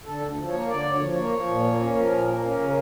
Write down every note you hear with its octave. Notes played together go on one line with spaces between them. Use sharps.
D3 A4
D2
F3
C#5
A#3
D3 D5
D2
C#5
F3
C#5
A#3
F3
A#2
A#3
C#4
F3 A#4
A#2
A#3
C#4
C#3